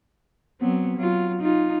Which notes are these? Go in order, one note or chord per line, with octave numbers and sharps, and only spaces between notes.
F#3 B3 C4
F#3 F4
D#4 F4